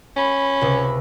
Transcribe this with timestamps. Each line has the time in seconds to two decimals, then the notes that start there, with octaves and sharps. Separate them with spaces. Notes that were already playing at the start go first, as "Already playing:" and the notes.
0.16 C#4 B5
0.61 C#2 C3